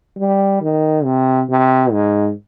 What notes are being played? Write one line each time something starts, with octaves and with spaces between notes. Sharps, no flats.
G3
D#3
C3
C3
G#2